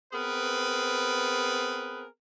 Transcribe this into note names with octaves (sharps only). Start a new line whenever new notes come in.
B3 C4 G#4 A#4 B4